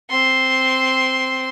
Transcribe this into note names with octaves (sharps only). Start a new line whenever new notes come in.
C4 C6